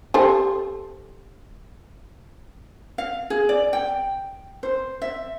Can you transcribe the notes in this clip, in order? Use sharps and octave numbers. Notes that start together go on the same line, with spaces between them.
G4 A4 C5
F5
G#4
D5
G5
C5
E5